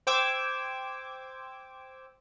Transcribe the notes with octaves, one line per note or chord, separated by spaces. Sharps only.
C5 G5 D6 E6 G#6